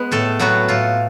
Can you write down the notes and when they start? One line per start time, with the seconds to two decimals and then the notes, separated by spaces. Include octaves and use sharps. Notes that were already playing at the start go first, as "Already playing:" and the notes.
Already playing: G#3 B3 B4
0.12 A2 A3 A4
0.39 F#3 B3 F#4
0.68 A2 F4